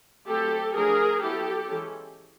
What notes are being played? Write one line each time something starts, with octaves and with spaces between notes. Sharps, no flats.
F#3 A3 C4 G4 A4
F3 A3 D4 G#4 A#4
F#3 B3 E4 G4 A4
E3 G#3 C#4